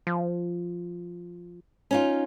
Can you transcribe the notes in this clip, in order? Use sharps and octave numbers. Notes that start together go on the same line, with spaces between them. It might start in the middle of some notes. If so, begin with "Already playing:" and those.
F3
C#4 D#4 F4